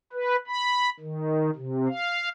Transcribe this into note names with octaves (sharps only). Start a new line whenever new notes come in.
B4
B5
D#3
C3
F5